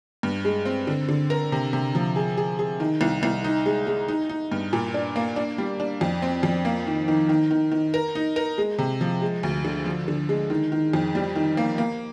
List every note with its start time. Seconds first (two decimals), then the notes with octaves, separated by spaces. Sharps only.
0.23 G2
0.45 G#3
0.65 C4
0.87 D3
1.08 D3
1.30 A#4
1.52 C3
1.73 C3
1.95 F3
2.16 G#4
2.37 G#4
2.59 G#4
2.80 D#3
3.01 C2
3.23 C2
3.44 D#4
3.66 G#3
3.87 G#3
4.08 D#4
4.29 D#4
4.52 G2
4.73 A#2
4.94 D4
5.16 A#3
5.36 D4
5.58 G3
5.80 D4
6.01 F2
6.22 C4
6.43 F2
6.65 A#3
6.87 D#3
7.08 D#3
7.29 D#3
7.51 D#3
7.71 D#3
7.94 A#4
8.15 D#4
8.36 A#4
8.58 G#3
8.78 C3
9.01 F3
9.22 G#3
9.43 D2
9.64 D3
9.85 F3
10.08 D3
10.29 G#3
10.50 D#3
10.72 D#3
10.93 F2
11.15 G3
11.35 D#3
11.57 A#3
11.78 A#3